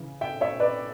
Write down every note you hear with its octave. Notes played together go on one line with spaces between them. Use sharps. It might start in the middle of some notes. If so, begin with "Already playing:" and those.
Already playing: C#3 E3
E5 G5
C#5 E5
B4 D5